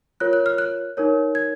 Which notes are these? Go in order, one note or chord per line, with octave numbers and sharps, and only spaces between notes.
F4 A#4 C#5 F#6
F#6
F6
F#6
D#4 A#4 C#5
G#6